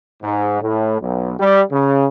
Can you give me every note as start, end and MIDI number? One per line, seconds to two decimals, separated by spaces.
0.22 0.60 44
0.61 0.97 45
1.00 1.33 35
1.38 1.62 55
1.71 2.05 49